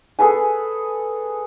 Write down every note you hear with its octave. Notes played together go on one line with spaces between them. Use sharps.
G#4 A4 B4 G#5